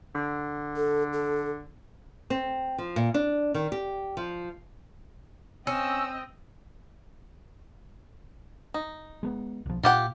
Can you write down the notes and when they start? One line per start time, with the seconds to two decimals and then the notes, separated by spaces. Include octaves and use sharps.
0.15 D3
0.76 A4
1.13 A4
2.30 C4
2.78 F3
2.96 A#2
3.14 D4
3.54 D#3
3.72 G4
4.17 F3
5.67 C4 C#4 D#5 E6
8.74 D#4
9.23 G#3 A3 B3
9.66 B1 F3
9.83 A#2 F4 G4 F#5